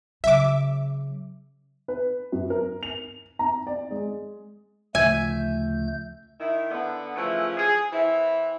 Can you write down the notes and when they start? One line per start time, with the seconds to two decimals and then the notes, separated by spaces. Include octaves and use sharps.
0.24 C#3 F#3 E5 D6
1.88 B4
2.32 F#2
2.50 A#4
2.83 F7
3.39 A#5
3.67 D5
3.91 G#3
4.95 D2 C#3 F3 A3 E5 G#5 G6
6.40 D#3 E4
6.70 D3 B3
7.16 C#3 E3 F3 A3
7.57 G#4
7.92 E3 C4 E4